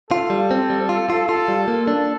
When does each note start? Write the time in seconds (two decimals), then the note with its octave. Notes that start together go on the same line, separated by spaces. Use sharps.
0.10 F4 A4
0.30 G3
0.51 C4
0.70 G3
0.89 F4
1.10 F4
1.29 F4 A4
1.48 G3
1.68 A#3
1.87 D4 A4